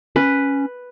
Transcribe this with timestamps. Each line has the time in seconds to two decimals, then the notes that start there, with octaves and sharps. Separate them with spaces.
0.16 C#4 B4